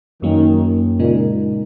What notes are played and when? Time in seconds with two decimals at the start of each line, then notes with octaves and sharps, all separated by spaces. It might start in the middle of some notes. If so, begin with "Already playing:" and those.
0.22 F#2 D#3 F#3 A#3 C#4
1.00 A#2 C#3 G#3 D#4